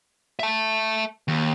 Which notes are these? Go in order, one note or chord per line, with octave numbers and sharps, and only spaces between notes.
E5 A5
D#2